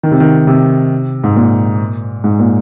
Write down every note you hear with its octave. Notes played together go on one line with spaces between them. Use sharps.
D#3
C3
D#3
C3
G#2
A#2
G#2
A#2